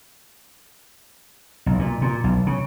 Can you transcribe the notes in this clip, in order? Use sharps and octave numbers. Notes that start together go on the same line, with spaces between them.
B1
A#2
A#2
B1
C#3